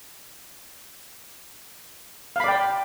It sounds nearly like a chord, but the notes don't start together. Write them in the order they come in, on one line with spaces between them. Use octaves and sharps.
F5 B5 D5 G5